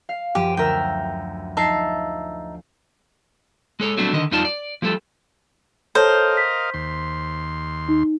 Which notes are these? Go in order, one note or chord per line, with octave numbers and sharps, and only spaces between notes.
F5
F#2 F3 G4 D#7
D2 A#4 E5 G5 E6
F3 D#4 E5 A5 C7
G#3 A4 C#5
F#3 G3 A3 C4 D4
D3 D#3 D#5
F2 G3 D#4 F4 D5 A5
D5
F3 G3 A3 A4
A4 A#4 C5 C#5 D#5 F5 A5
B6
D#2 C6
D#4